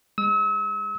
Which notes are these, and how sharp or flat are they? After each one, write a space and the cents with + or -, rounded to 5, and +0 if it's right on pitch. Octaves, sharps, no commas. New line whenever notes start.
G#3 -25 E6 -40